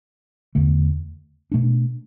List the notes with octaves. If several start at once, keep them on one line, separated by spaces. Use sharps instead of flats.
E2 D3 A3
B2 A3 D4